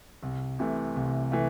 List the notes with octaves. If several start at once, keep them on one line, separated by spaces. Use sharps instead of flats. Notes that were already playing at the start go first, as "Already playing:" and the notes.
C2
C3 E3 A3
C2
E3 A3